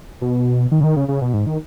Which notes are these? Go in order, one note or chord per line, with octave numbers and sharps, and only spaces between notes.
B2
D#3
C#3
D#3
C#3
C#3
B2
G#2
D#3